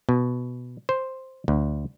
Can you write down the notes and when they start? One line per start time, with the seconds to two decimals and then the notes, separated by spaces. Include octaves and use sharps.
0.09 B2
0.89 C5
1.48 D2